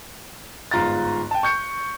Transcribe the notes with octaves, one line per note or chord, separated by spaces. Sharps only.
G1 G#2 F4 A#5 A6
G5 A5
C#6 G6 C#7